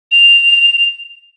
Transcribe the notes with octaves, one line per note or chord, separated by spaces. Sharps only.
F7